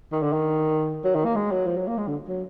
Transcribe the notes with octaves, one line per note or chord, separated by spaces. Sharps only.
D#3
D3
D#3
F#3
D#3
A#3
G#3
F#3
F3
F#3
A#3
G#3
D3
F#3